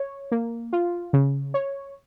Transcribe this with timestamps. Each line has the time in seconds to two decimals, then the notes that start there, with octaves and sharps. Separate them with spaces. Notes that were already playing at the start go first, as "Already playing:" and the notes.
Already playing: C#5
0.32 A#3
0.73 F4
1.13 C#3
1.54 C#5